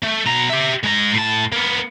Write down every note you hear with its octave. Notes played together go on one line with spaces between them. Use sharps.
A3
B2 A#5
G4 E5
G#3 A#5
A2 A5
A#3 B3